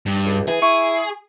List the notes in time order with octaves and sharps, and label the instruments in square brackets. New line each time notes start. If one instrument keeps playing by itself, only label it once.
[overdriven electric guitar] G2
[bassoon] C#2
[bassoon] E3 [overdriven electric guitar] G#4
[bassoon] E4 [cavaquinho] C#6